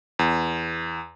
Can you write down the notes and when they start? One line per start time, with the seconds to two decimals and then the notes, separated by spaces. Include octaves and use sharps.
0.19 E2